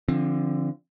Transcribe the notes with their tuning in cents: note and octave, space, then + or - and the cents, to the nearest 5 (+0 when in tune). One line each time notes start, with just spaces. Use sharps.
D3 +0 F3 -20 C4 +25